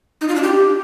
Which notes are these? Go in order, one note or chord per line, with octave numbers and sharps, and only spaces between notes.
D#4
F4
D4
G4